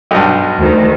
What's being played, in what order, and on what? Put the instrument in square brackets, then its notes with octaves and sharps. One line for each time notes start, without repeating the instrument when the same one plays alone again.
[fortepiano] B1 G2
[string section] D2 D#3